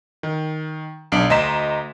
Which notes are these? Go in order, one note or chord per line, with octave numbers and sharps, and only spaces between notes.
D#3
B1 D4 D7
D2 D#5 A#5 C6 B6 E7